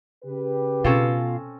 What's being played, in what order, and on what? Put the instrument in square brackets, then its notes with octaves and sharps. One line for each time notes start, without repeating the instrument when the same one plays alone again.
[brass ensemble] C#3 G4 B4
[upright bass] B2 [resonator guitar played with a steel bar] C4 C#4 A4 [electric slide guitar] F4